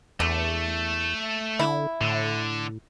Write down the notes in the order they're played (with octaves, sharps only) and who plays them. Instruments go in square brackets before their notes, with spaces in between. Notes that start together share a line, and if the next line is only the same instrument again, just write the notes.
[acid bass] E2 [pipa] D3 [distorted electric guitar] A3
[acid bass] D3 [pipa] E4
[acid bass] A2 [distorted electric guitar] D3